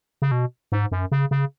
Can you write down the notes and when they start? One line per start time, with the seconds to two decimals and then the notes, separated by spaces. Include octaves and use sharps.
0.22 C#3
0.31 B2
0.72 G#2
0.92 F#2
1.12 C#3
1.31 C#3